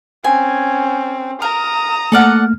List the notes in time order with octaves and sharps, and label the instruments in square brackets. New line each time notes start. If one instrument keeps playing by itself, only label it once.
[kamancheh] C4 C#4 [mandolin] G#5
[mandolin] A#4 [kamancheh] A#5 D#6
[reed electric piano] A3 A#3 F6 [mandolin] A4 D5 F#5